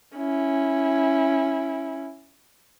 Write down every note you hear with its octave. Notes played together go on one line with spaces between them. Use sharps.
C#4 E4